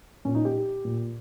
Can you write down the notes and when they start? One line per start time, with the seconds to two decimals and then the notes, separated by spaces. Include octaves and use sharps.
0.25 A#2 C#4
0.35 D#4
0.45 G4
0.85 A#2